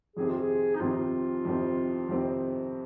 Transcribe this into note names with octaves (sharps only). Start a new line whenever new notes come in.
F2 C3 D#3 C4 G#4
F4
G#4
D#4
F2 C3 D#3 C4 F4
F2 C3 D#3 C4
F2 C3 D#3 C4